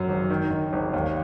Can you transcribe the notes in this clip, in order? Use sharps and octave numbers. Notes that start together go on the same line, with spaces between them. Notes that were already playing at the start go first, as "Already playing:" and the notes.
Already playing: F#2 F#3
G#1
D#3
D#3
G#1
D#2